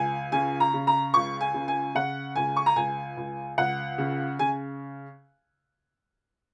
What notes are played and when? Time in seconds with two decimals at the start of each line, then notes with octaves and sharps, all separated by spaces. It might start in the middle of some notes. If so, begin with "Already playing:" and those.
Already playing: C#2 G#5
0.32 C#3 G#5
0.60 A#5
0.74 C#3
0.87 A#5
1.14 C#2 C#6
1.41 G#5
1.54 C#3
1.68 G#5
1.95 C#3 F#5
2.36 C#2 G#5
2.56 C#6
2.66 A#5
2.76 C#2 G#5
3.17 C#2
3.58 C#2 F#5
3.98 C#3
4.39 C#3 G#5